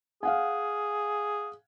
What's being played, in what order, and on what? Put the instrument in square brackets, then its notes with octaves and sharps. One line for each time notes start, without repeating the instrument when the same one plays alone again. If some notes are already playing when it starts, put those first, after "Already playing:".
[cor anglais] G#4 [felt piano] F5 F#5 G#5